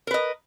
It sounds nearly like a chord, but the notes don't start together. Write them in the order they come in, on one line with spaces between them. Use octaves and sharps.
A#4 B4 D#5